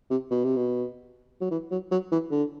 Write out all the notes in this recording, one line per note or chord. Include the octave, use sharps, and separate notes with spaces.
C3
B2
C3
B2
F#3
E3
F#3
F#3
E3
D3